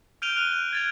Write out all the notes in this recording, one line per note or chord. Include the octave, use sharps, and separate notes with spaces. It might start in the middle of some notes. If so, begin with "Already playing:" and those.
F6 G6 D7 D#7 F7 G7
F6 F#6 D#7 F7 G7
F#6
G#6 A6 F7